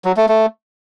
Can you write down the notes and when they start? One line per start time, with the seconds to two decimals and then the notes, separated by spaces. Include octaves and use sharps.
0.05 F#3
0.17 A3
0.28 A3